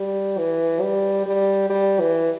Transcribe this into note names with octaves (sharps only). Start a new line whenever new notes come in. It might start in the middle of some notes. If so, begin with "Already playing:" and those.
Already playing: G3
E3
G3
G3
G3
E3